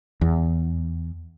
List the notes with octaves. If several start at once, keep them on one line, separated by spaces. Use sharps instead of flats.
E2